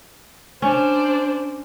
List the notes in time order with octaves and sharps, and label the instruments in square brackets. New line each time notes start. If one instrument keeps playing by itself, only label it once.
[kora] C#4 [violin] D4 C5